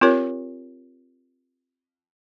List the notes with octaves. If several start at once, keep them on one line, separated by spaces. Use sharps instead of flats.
C4 F4 G4 A#4 C#5